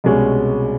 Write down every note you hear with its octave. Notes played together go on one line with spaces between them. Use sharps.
C2 B2 G#3 C#4